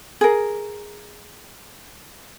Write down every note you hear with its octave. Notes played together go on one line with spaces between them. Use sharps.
G#4 A#4